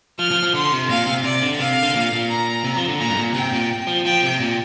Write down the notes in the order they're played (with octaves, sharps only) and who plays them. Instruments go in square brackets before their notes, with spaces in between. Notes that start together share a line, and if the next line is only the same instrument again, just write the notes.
[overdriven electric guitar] F3 [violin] F6
[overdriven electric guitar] F3
F3
[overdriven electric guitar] D3 [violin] C6
[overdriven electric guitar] C3
[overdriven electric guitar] A#2 [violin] F5
[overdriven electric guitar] C3
[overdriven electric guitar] C3 [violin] D5
[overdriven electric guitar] D3
[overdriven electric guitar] C3 [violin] F5
[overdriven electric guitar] D3
A#2
A#2
[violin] A#5
[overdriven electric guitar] C3
F3
D3
[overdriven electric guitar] A#2 [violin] A#5
[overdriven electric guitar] G2
A#2
[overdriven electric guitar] C3 [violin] G5
[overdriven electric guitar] A#2
F3
[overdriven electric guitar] F3 [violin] G5
[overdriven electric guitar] C3
A#2